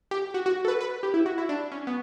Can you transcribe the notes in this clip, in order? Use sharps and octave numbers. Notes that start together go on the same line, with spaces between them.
G4
F#4
F#4
A4
B4
B4
G4
E4
F#4
E4
D4
C#4
B3